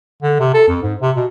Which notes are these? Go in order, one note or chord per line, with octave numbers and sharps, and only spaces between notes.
D3
C3
A4
F2
G#2
C3
B2